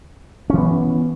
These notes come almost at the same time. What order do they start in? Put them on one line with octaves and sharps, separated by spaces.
C#4 E3 B3